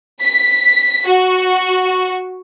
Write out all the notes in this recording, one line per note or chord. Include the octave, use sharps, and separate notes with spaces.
B6
F#4